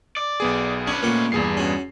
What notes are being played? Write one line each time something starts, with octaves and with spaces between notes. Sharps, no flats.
D5
B1 B3 G#4
C#4 D4 B4
A#2 A3 A#3 F#5 C6
E2 G2 G#4 C7
C#4 F#4